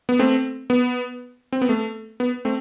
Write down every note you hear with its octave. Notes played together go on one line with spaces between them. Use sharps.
B3
A3 C4
B3
C4
B3
A3
B3
A3 C4